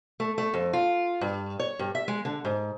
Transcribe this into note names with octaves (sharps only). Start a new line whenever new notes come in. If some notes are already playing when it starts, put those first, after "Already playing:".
A3
A3
F2
F4
G2
C#5
G2
E5
G#3
D3
G#2